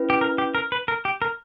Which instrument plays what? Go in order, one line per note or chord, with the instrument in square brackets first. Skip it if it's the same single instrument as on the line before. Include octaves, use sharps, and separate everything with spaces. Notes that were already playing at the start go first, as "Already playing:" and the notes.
Already playing: [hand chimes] C#4 E4 B4
[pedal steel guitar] G4
A#4
G4
A#4
B4
A#4
G4
A#4